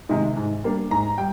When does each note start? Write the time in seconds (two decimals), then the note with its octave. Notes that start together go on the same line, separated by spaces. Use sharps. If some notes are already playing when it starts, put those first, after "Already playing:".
0.09 C3 D#3 G#3 D#4
0.36 G#2
0.64 G3 A#3 D4
0.91 G#2 A#5
1.18 G3 G5